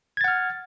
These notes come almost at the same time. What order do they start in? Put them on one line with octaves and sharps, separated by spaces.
G#6 A6 F#5 F6